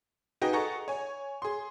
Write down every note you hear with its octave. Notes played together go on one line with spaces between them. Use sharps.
D#4 F#4 G#4 B4 D#5 G5
G#4 A4 D#5 F#5 A#5 C#6
C#5 G#5
G#4 C6